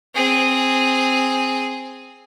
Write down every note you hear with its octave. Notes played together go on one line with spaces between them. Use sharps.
C4 G#4